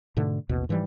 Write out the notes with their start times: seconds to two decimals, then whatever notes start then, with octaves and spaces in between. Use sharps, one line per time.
0.17 G#2 B2 D3 A3
0.49 A1 D#2 B2
0.69 G#2 E3 F3 G3